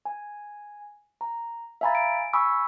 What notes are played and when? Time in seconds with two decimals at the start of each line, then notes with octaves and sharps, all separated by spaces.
0.05 G#5
1.21 A#5
1.81 E5 F5 G#5 A#5 B5 A6
1.95 D7
2.33 G#5 B5 C#6 D#6 E6